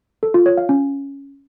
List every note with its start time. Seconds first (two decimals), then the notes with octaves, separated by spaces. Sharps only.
0.23 A4
0.34 F4
0.46 C#5
0.57 F5
0.69 C#4